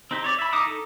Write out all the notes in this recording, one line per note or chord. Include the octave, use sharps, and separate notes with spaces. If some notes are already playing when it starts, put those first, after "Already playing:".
C4 D#4 G4
C#5 D5
E5 B5
D#4 E4 D6 D#6
D#4 A4